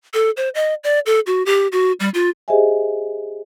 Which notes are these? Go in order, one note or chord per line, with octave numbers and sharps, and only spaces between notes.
A4
C5
D#5
D5
A4
F#4
G4
F#4
G3
F4
G4 G#4 C5 D#5 E5 G#5